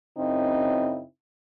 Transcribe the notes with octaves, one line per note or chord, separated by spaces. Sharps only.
F#2 C#3 C4 D#4 E4